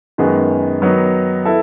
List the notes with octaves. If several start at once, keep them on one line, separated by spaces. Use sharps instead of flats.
F#2 D#3 G#3 B3
D#3 F#3 B3 D#4
B3 E4 A4